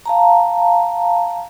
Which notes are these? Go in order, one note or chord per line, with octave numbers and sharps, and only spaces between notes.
F5 A5 A#5